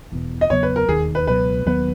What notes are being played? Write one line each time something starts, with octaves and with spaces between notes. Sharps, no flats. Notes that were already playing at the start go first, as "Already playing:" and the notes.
E1 E2 B2
D#5
E2 C#3 F#3 B3 C#5
B4
A#4
E1 D#2 D#3 G#4
B4
C#2 B2 F#3 B4
D#2 D#3 F#3 B3 B4